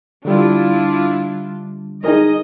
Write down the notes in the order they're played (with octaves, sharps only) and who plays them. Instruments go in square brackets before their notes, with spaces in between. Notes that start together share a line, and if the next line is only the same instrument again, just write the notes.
[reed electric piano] D3 G3 [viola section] D4 E4 F4
[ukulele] D#4 G#4 A#4 [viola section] D#5